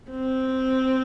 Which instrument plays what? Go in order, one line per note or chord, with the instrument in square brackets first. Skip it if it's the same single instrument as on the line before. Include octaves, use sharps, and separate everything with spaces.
[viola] C4